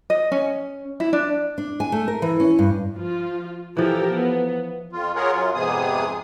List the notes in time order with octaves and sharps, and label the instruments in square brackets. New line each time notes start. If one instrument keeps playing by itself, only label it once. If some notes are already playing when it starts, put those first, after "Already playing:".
[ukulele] D#5
C#4
E4
D4
[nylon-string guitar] D4
G#5
A3
A#4
E3
C#4
G2
[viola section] F3 F4
[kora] E3 F3 [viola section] G4 A4 A#4
[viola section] B3
[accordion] F2 F4
F4 G#4 A#4 C#5 F#5
F#2 F#3 F4
F2 G#2 C3 B3 G#4 D#6